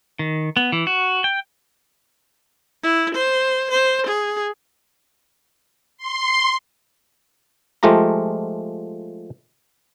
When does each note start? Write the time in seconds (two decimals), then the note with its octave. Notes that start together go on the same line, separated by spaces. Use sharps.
0.19 D#3
0.57 B3
0.72 E3
0.87 F#4
1.24 G5
2.83 E4
3.15 C5
3.71 C5
4.07 G#4
5.98 C6
7.83 F3 G#3 A3 F4 G4 A#5